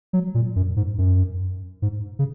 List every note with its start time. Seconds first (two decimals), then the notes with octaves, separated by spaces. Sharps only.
0.13 F#3
0.34 A#2
0.56 F#2
0.76 G#2
0.98 F#2
1.82 G#2
2.19 C#3